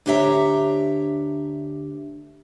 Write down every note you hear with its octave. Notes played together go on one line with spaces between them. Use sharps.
D2 D4 G4 C#5 E5 A#5